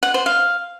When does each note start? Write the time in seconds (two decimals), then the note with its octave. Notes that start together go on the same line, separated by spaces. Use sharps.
0.03 F#5
0.14 C5
0.26 F5